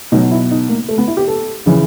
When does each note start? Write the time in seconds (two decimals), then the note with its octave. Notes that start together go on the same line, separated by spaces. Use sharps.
0.12 B2 F#3 D#4
0.31 E4
0.51 D#4
0.69 A#3
0.89 A3
0.98 B3
1.08 E4
1.17 G4
1.28 A4
1.66 C#3 E3